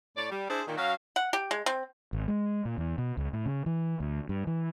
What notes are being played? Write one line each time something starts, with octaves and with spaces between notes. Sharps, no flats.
A2 C#5 D5
G3
D4 E4 G#4 C5
A#2 D#3
F#3 C#4 F#4 F5
F#5
G4
G#3
C4
G#1
G#3
A#2
E2
B2
C#2
A2
C#3
E3
D2
G2
E3